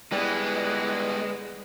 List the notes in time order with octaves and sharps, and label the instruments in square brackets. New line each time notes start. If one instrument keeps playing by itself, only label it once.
[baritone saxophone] E3 [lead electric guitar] G3 B3 [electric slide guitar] G#3 [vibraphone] D5